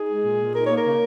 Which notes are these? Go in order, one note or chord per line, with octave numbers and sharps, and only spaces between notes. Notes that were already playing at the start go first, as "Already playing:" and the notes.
Already playing: D#4 G#4
G#3
A#2
A#2
D#4 A#4
A#3 C#5
A#4
C#3